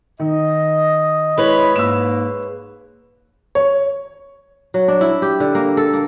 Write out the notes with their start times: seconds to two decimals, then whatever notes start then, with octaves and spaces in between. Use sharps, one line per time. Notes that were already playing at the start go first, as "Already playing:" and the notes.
0.20 D#3 D#5
1.38 G#3 E4 B4 C#5 B5
1.76 G#2 A#3 E6 E7
3.55 C#5
4.74 F#3
4.88 D4
5.01 E4
5.22 G4
5.40 D3
5.55 A#3
5.77 A4
5.93 A#3